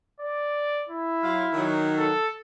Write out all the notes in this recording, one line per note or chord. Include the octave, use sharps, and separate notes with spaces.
D5
E4
F#3 F5 C6
D#3 F#3
A4